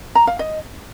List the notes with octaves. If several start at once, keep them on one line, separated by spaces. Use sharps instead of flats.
A#5
F5
D#5